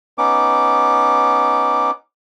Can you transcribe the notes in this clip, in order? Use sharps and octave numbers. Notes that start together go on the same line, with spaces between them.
B3 C#4 D#4 D6